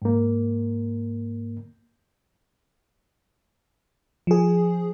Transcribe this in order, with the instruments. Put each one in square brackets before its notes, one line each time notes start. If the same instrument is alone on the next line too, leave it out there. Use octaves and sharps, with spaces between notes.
[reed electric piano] G#2 A#3
[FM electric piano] F3 G#4